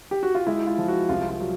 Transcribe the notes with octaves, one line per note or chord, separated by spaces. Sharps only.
G4
F#4
F4
G#3 E4
F4
F3
F#4
C2 F4
F4
F#3